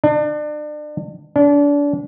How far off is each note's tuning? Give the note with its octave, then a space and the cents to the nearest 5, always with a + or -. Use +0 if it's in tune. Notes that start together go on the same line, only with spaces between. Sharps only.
D4 +35
D4 -30